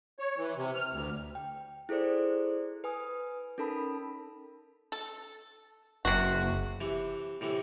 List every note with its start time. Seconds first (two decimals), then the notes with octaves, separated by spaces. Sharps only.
0.19 C#5
0.38 E3
0.57 C3
0.75 F6
0.93 D2
1.35 G5
1.89 E4 G#4 A4 C5 D5
2.84 B4 G#5 D#6
3.58 C#4 D#4 A4 A#4 A5 B5
4.92 A4
6.05 F#1 C3 F#4
6.80 C3 E3
7.41 A2 C3 E3